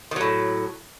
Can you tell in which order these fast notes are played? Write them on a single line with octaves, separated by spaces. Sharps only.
D#3 F#3 A2